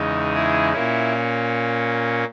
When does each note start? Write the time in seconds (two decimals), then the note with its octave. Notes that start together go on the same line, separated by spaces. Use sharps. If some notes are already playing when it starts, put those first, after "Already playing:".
Already playing: E2 C#3 G#3 D#4
0.34 E4 G#4
0.73 A#2 A#3 C#4 E4